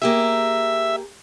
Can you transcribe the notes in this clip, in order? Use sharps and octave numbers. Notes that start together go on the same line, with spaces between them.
A#3 G4 G#4 E5